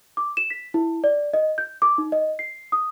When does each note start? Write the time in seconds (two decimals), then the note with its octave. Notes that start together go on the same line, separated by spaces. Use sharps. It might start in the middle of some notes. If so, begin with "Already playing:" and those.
0.17 D6
0.37 E7
0.50 B6
0.74 E4
1.04 D5
1.34 D#5
1.58 G6
1.82 D6
1.98 D#4
2.12 D#5
2.39 C7
2.72 D#6